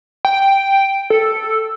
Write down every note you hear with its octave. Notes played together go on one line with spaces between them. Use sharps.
G5
A4